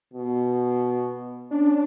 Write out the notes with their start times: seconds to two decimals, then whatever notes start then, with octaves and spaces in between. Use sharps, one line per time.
0.14 B2
1.51 C#4 D4